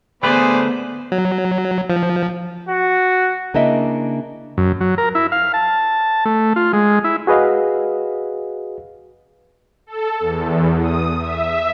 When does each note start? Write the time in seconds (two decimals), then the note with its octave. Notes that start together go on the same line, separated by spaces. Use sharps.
0.23 D3 A3 B3 G#4 B4 C5 D5
1.12 F#3
1.90 F3
2.69 F#4
3.54 C#3 A#3 D4 E4 D#5 E5
4.58 F#2
4.81 F#3
4.98 A#4
5.15 E4
5.32 F5
5.54 A5
6.25 A3
6.56 F4
6.73 G#3
7.04 E4
7.27 F#4 G#4 B4 D#5 F5
9.87 A4
10.20 E2
10.80 D#6
11.19 E5